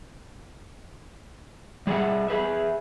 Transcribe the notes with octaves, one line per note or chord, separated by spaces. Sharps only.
G3 G#4 D5 E5 F#5
G#4 B4 E5